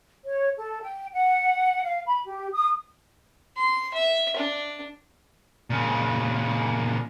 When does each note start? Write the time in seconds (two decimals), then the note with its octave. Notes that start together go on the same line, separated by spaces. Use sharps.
0.24 C#5
0.56 A4
0.81 G5
1.12 F#5
1.84 F5
2.06 B5
2.25 G4
2.52 D#6
3.57 C6
3.94 E5
4.36 D4
5.70 A#2 C#3